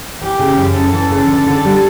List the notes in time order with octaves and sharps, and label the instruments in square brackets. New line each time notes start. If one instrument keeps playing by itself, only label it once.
[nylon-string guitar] E3 [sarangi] G4
[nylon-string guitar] C#3
F#2
[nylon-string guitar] F#2 [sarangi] A4
[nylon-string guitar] E3
C#3
D3
D3
G3